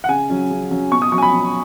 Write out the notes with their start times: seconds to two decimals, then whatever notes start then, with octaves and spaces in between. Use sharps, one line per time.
0.04 F#5
0.09 C#3 G#5
0.30 F#3 C#4
0.50 C#3
0.71 F#3 C#4
0.91 B2 C#6
1.02 D#6
1.12 F#3 C#6
1.16 C#4 G#5
1.22 B5
1.32 B2